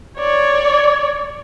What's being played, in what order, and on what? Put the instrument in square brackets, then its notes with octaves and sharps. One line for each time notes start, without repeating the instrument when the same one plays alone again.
[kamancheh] C#5 D5